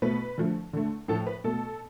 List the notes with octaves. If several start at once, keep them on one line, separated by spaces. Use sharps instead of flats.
B2 A3 B4
D3 F3 A3
D3 A3
A2 F3 A3 A4
B4
B2 A3 A4